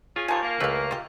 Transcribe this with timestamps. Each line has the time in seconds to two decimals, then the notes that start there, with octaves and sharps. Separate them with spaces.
0.16 C#4 F4 G#4
0.28 D#2 F3 G#5 A5
0.42 A#3
0.60 C#2 E3 A3 B4 F5
0.91 F4 G4